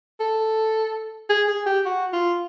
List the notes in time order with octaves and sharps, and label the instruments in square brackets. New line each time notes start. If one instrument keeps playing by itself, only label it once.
[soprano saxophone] A4
G#4
G#4
G4
F#4
F4